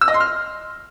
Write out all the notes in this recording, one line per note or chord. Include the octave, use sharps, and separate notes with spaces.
E6
D#5
C6
F6